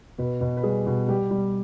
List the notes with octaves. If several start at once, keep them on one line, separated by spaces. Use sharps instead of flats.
B2 B4
B2
B4
G3 G#4
B2
G3 G4
G3